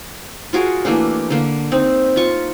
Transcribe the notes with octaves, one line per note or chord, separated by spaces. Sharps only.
F4 F#4 G#4 A#4
E3 A3 A#3 D4
D3 A#3
C4 D#4
F4 C#6